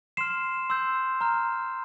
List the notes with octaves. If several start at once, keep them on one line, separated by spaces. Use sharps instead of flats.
C6 F6 C7 E7
C6 E6 G6
A#5 F6